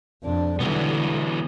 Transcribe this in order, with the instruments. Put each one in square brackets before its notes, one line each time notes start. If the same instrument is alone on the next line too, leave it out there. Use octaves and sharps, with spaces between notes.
[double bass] F2 D4
[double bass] D3 G3 [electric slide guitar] E3 F#3 B3